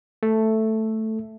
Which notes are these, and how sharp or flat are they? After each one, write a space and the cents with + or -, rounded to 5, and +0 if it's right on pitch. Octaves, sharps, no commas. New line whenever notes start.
A3 +0 A4 +0 E5 +0